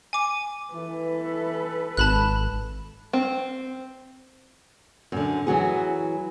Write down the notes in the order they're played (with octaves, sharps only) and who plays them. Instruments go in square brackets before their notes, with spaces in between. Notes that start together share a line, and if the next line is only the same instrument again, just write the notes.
[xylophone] G#5 D6
[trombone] E3 [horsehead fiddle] A4 B4
[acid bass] G#1 [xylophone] A5 B5 F#6
[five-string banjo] C4
[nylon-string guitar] F#2 D3
E3 F#3 F#4 G#4